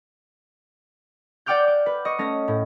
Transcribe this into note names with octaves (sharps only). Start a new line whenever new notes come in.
D5 F#5 G5 D6 F6 G6
D6
B4
D#5 C#6
A3 C#4 A#6
A2